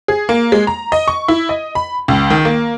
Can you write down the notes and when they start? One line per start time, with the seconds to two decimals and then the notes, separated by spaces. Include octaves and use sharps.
0.08 G#4
0.29 A#3
0.52 G#3
0.67 A#5
0.92 D#5
1.08 C#6
1.28 E4
1.49 D#5
1.75 B5
2.08 C#2
2.30 D#3
2.45 A#3